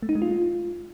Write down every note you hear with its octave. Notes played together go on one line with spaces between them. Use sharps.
A3
D#4
G#3
F4